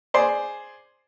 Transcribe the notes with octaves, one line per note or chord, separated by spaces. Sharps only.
G#4 C5 D5